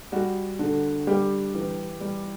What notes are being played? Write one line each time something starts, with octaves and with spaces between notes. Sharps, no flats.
G3 F#4
D3
G3 G4
E3
G3